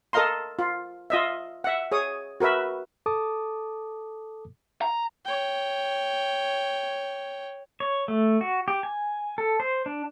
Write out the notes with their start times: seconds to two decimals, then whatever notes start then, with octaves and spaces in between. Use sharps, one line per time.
0.13 A4 A#4 D#5 F5 A#5 C6
0.59 F4
1.10 F4 D#5 E5
1.64 E5 F#5
1.92 G#4 C#5 D#6
2.40 F#4 A#4 B4 E5
3.06 A4 A5 D6 D#6
4.82 A#5
5.26 C#5 G5
7.80 C#5
8.08 A3
8.41 F#4
8.68 G4
8.83 G#5
9.38 A4
9.60 C5
9.86 D4